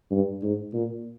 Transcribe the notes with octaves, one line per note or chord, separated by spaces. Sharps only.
G2
G#2
A#2